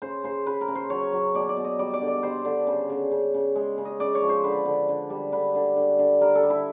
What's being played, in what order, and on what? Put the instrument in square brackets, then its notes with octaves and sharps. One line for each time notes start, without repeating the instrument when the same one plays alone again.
[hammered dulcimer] C#3 C5
C#3 C5
C#3 B4
A#4
C#3
C5
F#3 C#5
F#3
B2 D5
D5
B2
D#5
G3 D5
D5
D3
D5
G3 C5
D3
C#3
C#3
C#3
C#3
G#3
C#3
D#5
C#3 D5
C#5
F3
C5
D3 B4
D3
D3
G3
D3 B4
D3
D3
D3
G3 A#4
A4
G3
E4